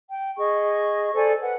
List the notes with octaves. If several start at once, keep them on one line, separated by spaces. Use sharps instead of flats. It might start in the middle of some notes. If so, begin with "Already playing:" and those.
G5
G#4 D#5 C#6
A4 C5 D5 G#5
B4 F#5